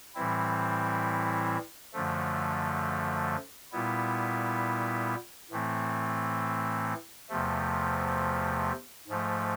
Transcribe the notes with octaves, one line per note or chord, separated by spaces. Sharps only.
A2 E3 G3 C4 E4
F#2 D3 F3 A3
A#2 G3 B3 E4
A2 E3 A3 C4
E2 C3 F3 A3
G#2 F3 A3